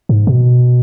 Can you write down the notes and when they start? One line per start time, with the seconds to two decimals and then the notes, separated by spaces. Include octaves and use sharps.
0.09 G#2
0.27 B2